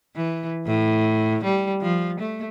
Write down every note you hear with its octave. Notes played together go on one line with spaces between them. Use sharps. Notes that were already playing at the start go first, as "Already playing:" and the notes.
E3
A2
G3
F3
A3